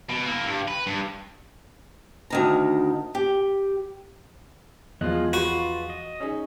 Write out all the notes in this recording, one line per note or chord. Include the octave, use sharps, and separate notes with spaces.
B2
A#3 E4
G2
B4
G2
D2 D#3 A#5
G4
E2 F3 F#3 G#3 F4 G#4 D#5 F#6
F4 F#4 B4
D#5
C#4 D#4 G#4